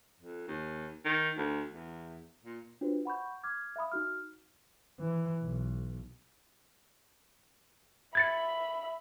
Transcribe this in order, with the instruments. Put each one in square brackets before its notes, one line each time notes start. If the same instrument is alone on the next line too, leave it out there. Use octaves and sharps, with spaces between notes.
[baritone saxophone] F2
D#2
D#3
D2
E2
A#2
[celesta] D4 F4 F#4 B4 C5
F#5 B5 C#6 G6
D6 F6 G#6
E5 F5 B5 D#6
D#4 F#4 F6
[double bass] E3
B1
[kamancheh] E5 B5 [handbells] G#6 A6 C#7